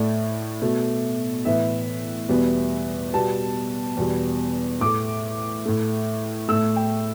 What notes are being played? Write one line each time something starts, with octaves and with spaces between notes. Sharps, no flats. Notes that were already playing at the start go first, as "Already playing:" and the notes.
Already playing: A2 A3 D5
B2 A3
A2 E3 B3 E5
E2 B2 G3 B3
B2 G3 B3 A5
E2 B2 G3
A2 A3 D6
A2 A3
A2 A3 E6
G5